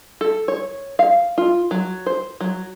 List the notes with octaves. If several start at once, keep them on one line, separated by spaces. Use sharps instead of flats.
A4
C#5
F5
F4
F#3
C5
F#3